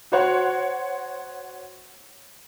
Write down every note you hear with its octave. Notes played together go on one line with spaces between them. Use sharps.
F#4 C5 C#5 F#5 C6